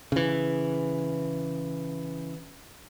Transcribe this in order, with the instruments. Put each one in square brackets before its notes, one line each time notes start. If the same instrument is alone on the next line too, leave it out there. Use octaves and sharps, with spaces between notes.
[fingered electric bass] C#3 E3